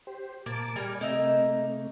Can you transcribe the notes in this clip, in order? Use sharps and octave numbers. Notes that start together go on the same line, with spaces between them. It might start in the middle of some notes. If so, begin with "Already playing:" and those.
G4 C5
A#2 A#3 A5 D6
G3 A#4 D5 G#5
C3 A3 A#3 D#4 E5